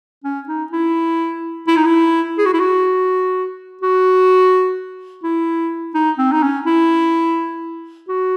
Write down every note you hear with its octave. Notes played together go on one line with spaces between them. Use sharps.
C#4
D#4
E4
E4
D#4
E4
G#4
F#4
E4
F#4
F#4
E4
D#4
C4
D#4
C#4
E4
F#4